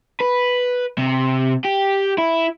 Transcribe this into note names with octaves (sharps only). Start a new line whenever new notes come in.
B4
C3
G4
E4